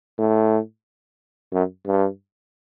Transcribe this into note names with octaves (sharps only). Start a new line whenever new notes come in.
A2
F#2
G2